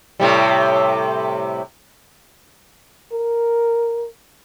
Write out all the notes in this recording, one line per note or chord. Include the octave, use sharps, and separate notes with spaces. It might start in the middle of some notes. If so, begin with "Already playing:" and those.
A2 C3 G3
A#4